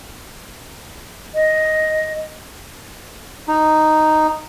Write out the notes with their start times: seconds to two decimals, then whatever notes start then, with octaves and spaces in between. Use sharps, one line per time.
1.35 D#5
3.48 D#4